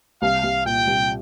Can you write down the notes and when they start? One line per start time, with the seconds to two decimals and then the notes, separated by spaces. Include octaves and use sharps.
0.22 C2 F5
0.44 C2
0.65 A#2 G5
0.87 C2